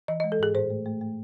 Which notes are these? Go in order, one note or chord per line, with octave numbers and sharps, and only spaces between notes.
E3 D#5
G#3 D#5
A4
G#2 G#4
A2 C5
A3
A3
A3